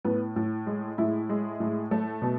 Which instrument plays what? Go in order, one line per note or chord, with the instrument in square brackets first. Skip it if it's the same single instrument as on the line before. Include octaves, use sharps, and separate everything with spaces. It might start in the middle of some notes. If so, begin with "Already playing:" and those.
[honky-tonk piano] A2 B3
A2
G#3
A2 E4
G#3
A2
A3
B2